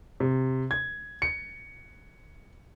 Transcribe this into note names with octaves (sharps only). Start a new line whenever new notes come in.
C3
G#6
C#7